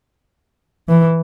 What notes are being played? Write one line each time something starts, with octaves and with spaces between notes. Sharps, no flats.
E3